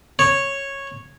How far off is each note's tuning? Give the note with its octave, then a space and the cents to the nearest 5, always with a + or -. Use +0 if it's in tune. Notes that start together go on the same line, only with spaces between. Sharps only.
C#5 -10